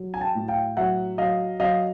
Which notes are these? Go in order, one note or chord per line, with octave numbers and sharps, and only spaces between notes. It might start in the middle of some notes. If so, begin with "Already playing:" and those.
Already playing: F#3
G#5
G5 A5
A2
F5 G5
F#3 E5 F#5
F#3 D#5 F5
F#3 D#5 F5